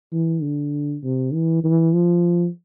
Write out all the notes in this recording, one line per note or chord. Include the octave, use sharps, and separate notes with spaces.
E3
D3
C3
E3
E3
F3